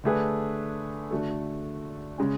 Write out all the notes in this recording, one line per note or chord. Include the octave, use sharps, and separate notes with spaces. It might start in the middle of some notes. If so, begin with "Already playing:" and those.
D3 A3 D4 G#4 B4
D3 A3 D4 F#4 A4
C#3 G#3 C#4